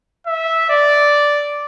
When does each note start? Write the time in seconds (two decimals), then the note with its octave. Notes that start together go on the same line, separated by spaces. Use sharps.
0.27 E5
0.70 D5